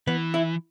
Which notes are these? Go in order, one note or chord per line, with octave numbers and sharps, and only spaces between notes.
E3 B3
E4